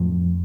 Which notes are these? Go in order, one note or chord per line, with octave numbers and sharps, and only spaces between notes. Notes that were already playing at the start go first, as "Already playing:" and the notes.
Already playing: F2 A2 F3